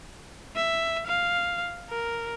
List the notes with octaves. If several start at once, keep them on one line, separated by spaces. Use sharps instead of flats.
E5
F5
A#4